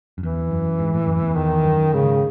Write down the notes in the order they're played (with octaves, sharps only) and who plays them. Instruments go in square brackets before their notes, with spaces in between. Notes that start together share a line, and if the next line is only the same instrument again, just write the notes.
[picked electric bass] F#2
[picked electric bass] E2 [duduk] E3
[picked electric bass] F#2
G#2
A2
F#2
E2
[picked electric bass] E2 [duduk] D#3
[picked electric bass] F#2
[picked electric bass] G#2 [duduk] C#3